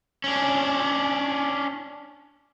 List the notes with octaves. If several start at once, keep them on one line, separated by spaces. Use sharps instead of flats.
C#4 D4